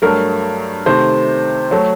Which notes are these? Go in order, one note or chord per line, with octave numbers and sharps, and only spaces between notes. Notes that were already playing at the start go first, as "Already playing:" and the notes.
G2 F#3 A3 A#4
C3 D#3 A3 C5
F#3 A3